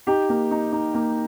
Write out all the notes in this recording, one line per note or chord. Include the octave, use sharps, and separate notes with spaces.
D#4 G4
A#3
D#4
D#4
A#3